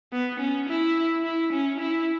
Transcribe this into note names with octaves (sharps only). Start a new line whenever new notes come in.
B3
C#4
E4
E4
C#4
E4